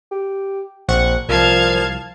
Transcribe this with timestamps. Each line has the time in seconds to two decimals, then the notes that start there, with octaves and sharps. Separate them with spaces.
0.11 G4
0.88 A#1 C4 F#5 C#6
1.29 C2 A#2 F3 F5 A5 G#6